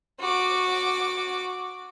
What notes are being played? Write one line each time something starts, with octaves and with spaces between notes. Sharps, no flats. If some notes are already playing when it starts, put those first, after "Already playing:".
F#4 D6